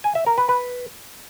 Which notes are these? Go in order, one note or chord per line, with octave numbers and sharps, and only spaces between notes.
G#5
E5
A#4
B4
B4